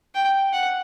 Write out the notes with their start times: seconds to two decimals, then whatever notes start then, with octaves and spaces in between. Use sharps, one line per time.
0.15 G5
0.53 F#5